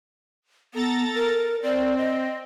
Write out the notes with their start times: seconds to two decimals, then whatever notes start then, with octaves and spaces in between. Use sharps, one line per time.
0.74 B3 A4 A#5 A6
1.15 A#4
1.63 C4 D5
1.97 D#5